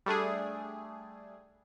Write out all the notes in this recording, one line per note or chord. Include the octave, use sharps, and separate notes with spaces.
G3 A3 D4 G#4